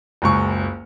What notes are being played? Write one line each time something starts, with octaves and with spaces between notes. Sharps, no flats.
F#1 C#2 C#6